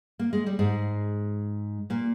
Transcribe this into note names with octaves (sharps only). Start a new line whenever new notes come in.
A#3
G#3
G3
G#2 G#3
A#2 A#3